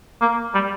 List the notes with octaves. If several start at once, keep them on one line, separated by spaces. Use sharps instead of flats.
A#3
G3